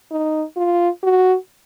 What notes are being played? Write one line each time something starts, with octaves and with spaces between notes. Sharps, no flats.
D#4
F4
F#4